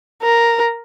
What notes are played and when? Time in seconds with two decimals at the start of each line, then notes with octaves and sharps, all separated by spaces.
0.23 A#4